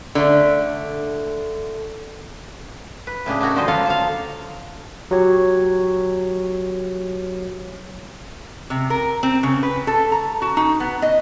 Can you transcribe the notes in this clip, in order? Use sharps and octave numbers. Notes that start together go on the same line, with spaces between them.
D3 A3
B4
A2 C#3 D4 G#4
D4 D#4 F#4 A#4
D3 F3 G3 C5 D#5
F#3 D4 F4 A4 F5
C5 F5
F#3 F#4 G4 C#5
C3
A#4
C4
C#3
B4
A4
A#5
F#4
D#4
B3
D#5